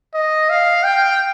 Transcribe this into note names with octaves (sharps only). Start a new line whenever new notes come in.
D#5
F5
G5